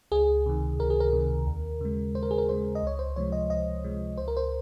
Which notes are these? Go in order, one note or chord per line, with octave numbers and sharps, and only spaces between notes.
C#2 G#4
C3 D#3
C#2 A#4
G#4
A#4
C3 D#3
D#2
C#3 G#3
D#2 C5
A#4
G#4
A#4
C#3 G#3 C5
D#5
C#2 C#5
C5
C3 F3 G#3 C#5
D#5
C#2 D#5
C3 F3 G#3
C#2 C5
A#4
C5